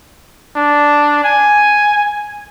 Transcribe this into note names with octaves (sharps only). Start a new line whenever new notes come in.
D4
G#5